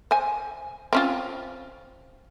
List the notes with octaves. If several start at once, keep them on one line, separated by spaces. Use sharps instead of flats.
C5 G#5
C4 C#4 F4